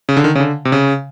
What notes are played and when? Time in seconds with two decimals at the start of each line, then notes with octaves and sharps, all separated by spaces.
0.09 C#3
0.17 D3
0.24 D#3
0.35 C#3
0.40 D3
0.65 C3
0.72 C#3